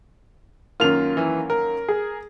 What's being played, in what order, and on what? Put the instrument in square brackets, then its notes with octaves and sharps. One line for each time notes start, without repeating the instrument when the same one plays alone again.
[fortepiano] F#2 D#3 A#3 [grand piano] F4 F7
[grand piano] E3
A#4
[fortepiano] G#4